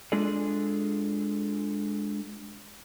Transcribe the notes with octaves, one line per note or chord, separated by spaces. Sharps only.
G#3 D4 F4 G#4 A4 D5